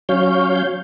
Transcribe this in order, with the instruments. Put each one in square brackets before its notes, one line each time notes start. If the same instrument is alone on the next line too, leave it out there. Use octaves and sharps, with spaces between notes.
[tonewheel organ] F#3 C#4 C#5 F5 G6